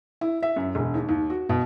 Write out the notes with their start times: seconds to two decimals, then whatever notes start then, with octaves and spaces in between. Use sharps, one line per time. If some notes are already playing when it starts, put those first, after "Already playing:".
0.21 E4
0.43 E5
0.56 F#2
0.75 E1
0.94 D#2
1.09 D#2
1.30 F#4
1.49 B2